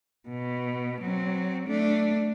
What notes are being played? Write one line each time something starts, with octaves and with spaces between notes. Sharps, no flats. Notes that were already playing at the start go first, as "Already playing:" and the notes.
B2
F#3 C4
A3 D4